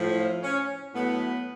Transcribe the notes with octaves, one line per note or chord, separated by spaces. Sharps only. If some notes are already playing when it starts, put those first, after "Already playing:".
Already playing: A2 F3
C#4
A2 F#3 B3